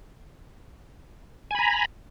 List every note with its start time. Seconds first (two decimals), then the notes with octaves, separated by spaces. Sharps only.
1.51 G#5
1.55 B5
1.59 A#5